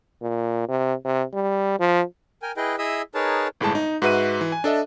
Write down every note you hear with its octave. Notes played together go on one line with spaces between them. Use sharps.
A#2
C3
C3
G3
F3
A#4 G5 G#5
E4 G#4 B4 D#5 G5
E4 G#4 D#5 E5 D#6 E6
D#4 G#4 A#4 B4 C#5 A5
G1 A2 G#3 A5
D#4
G#2 F#4 B4 E5 F#6 D#7
E3
G#5
D4 A4 D#5 E5